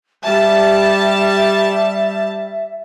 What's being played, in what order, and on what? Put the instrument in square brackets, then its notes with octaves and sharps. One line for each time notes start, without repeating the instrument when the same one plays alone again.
[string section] G3 A5 [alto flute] E5